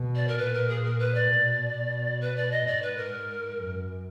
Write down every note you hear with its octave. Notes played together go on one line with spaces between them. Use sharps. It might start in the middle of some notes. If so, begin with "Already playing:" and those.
Already playing: B2
D5
A#4
A#2 B4
A#4
G#4
A#4
B4
D5
B2
B2
B4
D5
D#5
G#2 D5
B4
A#4
F#2